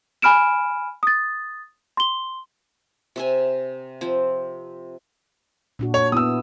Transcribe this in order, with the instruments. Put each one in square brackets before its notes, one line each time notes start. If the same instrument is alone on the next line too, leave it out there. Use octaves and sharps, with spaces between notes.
[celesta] G#5 B5 F6 D7 E7
D#6 A6
C6 G7
[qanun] C3 E5 G#5
F3 C4
[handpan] A#2 D4 F#4
[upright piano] C#5
[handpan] B3 E4 F#4 [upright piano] D#6 E6